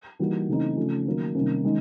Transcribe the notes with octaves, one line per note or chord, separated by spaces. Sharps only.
E3 G3 A#3 D#4 F#4
C#3 E3 A3 C4 D#4
C#3 F3 A3 C#4
D#3 F#3 A#3
C3 D#3 G3 A#3 C#4
D#3 G#3 C#4